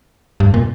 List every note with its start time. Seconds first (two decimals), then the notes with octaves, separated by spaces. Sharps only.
0.40 G2
0.54 A#2